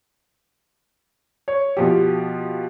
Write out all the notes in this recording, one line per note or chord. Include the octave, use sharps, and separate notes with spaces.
C#5
B2 F3 G4